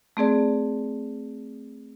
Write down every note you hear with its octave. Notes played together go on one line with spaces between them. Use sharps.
A3 C4 G#4 D5